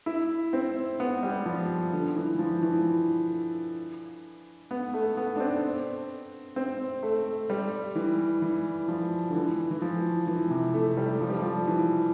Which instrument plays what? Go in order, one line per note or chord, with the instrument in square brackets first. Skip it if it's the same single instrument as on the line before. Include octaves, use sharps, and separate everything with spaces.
[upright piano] E4
C4
B3
G3
F3
D3
E3
F3
E3
B3
A3
B3
D4
C4
C4
A3
G3
E3
E3
F3
D3
E3
E3
F3
E3
C3
A3
G3
F3
G3
F3
E3